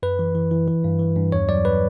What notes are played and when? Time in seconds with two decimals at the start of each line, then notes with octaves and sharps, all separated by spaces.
0.03 F#2 B4
0.19 E3
0.35 E3
0.51 E3
0.68 E3
0.84 G2
1.00 E3
1.16 G2
1.32 E2 C#5
1.49 F#3 D5
1.65 B4